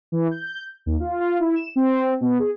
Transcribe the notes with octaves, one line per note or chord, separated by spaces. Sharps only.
E3
G6
D#2
F4
F4
E4
E7
C4
B2
G#4